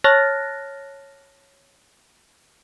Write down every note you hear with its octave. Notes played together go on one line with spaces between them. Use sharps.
C#5 A5 F6 F#6 A6 A#6